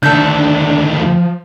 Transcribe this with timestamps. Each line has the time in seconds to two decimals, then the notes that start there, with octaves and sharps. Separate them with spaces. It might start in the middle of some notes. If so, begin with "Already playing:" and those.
0.03 D2 D#3 D4 A4 E5 G6
0.95 F3